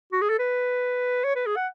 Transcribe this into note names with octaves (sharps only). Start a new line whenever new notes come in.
F#4
G#4
A4
B4
C#5
B4
G#4
F#5